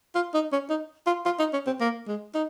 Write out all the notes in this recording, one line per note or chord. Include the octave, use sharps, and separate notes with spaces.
F4
D#4
C#4
D#4
F4
F4
D#4
C#4
C4
A#3
G#3
D#4